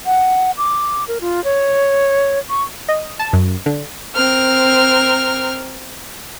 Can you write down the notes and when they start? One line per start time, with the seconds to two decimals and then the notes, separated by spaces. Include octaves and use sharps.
0.06 F#5
0.58 D6
1.08 A#4
1.21 F4
1.44 C#5
2.50 C#6
2.89 D#5
3.19 A5
3.33 F#2
3.66 D3
4.15 C4 A#4 F6